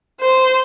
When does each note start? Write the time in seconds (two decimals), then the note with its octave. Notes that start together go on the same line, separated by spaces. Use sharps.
0.20 C5